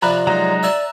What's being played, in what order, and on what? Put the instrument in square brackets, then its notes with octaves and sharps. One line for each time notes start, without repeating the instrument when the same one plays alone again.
[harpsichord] C3 F3 [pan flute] D5 [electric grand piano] A#5 B5 F#6
[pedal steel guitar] F#3 G#3 D#4 [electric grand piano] A#5
[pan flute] D5 [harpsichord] E5 G#5 A5